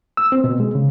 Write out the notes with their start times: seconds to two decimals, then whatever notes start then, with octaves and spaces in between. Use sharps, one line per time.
0.17 E6
0.32 C4
0.44 B2
0.60 G#3
0.75 C#3